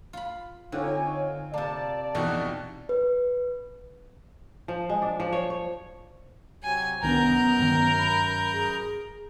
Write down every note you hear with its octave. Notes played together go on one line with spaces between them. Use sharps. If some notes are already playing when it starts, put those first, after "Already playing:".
F4 B5
D3 C4 D#4 F4 C#5 G#5
C3 A#3 D5 A5
F2 B2 E3 D#4 F#4
B4
F3
G#3
D4
F3
C#5
C#5
C3 F#3 G#5
C2 F#2 D#3 B3 D4 A#4 A#5 G6
G2 D#3
B5
G#4